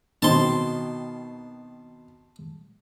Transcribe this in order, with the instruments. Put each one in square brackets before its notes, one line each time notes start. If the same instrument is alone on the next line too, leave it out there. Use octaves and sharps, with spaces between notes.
[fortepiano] B2 D#3 C4 [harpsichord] A5 C6